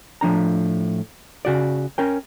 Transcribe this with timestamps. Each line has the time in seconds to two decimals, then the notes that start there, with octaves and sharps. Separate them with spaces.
0.21 A2 F3 D4 A#5
1.45 C#3 F#4 D5
1.98 C#4 A#4 G5